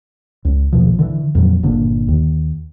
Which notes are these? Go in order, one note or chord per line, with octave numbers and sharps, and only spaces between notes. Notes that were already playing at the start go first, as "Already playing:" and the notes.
C#2
A#1 D#2 B2 F3
D3 E3
F2 A#2 F#3
G1 A#2 D3
D#2